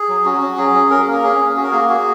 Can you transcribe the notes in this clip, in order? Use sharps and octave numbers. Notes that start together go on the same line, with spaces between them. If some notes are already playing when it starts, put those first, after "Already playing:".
Already playing: G#4
F#3
C#4 F#4
C#4
F#3 G#4
C#4
C#4 A#4
G#4
A#3
A#4
C#4 G#4
C#4
F#4 G#4
A#4
A#3 G#4
F#4 G#4